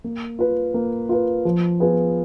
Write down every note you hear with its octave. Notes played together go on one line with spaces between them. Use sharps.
A#3
F4 B4
A#3
F4 B4
F3
B3 F4 G#4 B4